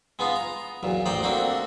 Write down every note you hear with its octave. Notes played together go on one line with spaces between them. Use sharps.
G#3 B3 D#4 F4
A#5
B1 E2 A#2
A1 D#4 C5 D5 G5
A3 A#3 C4 D4 F#4